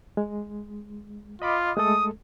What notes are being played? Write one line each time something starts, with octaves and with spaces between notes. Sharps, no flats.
G#3
F4 D#5 B5 D6
G#3 A3 A4 D#6